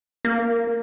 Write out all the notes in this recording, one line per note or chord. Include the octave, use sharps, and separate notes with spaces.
A#3